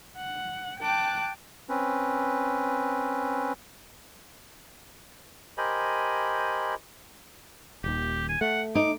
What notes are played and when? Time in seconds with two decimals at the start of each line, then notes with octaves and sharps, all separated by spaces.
0.17 F#5
0.81 G5 A5 D6 F#6
1.69 C4 C#4 B4
5.58 G4 A#4 C5 D#5 G#5 B5
7.84 D#1 D#2 G4
8.29 G#5
8.41 A3 F#5
8.75 D#4 D6